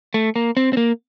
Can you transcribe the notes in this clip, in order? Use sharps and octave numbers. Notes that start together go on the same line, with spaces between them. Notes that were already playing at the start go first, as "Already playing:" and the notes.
A3
A#3
C4
C4
A#3